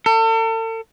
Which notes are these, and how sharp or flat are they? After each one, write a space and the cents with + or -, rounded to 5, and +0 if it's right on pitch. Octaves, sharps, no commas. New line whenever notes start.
A4 +40